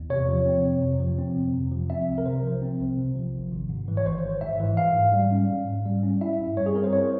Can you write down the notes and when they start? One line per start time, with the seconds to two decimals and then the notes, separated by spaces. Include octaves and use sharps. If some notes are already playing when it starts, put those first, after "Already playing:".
Already playing: E2
0.10 C3 C#5
0.28 F3
0.46 C4
0.64 F2
0.82 C3
1.00 F3
1.18 C4
1.37 F2
1.53 C3
1.72 F3
1.90 C4 E5
2.08 C2
2.18 A#4
2.26 C3 C5
2.43 F3
2.62 C4
2.79 C2
2.97 C3
3.15 F3
3.34 G#1
3.51 G#1
3.69 G#2
3.88 E3
3.97 C#5
4.05 G#1 C5
4.24 G#1
4.41 G#2 E5
4.60 E3
4.77 G#2 F5
4.96 G#2
5.13 G3
5.31 C#4
5.50 G#2
5.67 G#2
5.86 G3
6.03 C#4
6.21 E4 E5
6.39 G2
6.57 G3 C#5
6.66 G#4
6.74 C4 A#4
6.84 C5
6.93 E4 C#5